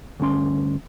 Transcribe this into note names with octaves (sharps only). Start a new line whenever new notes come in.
D2 G2 C#4 C6